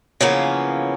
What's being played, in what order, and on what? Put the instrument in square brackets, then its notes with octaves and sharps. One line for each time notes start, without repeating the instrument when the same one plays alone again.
[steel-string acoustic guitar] C#3 E3 F3 A#3 B3 C#4